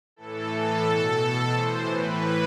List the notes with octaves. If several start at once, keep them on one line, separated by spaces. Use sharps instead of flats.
A2 E3 A4
A2 E3
B2 A4
B2
A2 E3 C5
A2 E3 B4